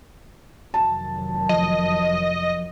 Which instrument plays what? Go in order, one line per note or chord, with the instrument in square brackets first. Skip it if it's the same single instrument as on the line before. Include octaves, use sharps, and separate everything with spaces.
[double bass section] F1 D#3 F#3 [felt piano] A5
[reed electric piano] F3 [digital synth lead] D#5